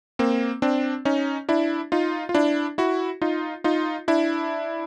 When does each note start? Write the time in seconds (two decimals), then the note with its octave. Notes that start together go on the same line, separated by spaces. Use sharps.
0.19 A#3 C4
0.62 C4 D4
1.05 C#4 D#4
1.49 D4 E4
1.92 D#4 F4
2.29 F4
2.34 D4 E4
2.78 E4 F#4
3.21 D#4 F4
3.64 D#4 F4
4.08 D4 E4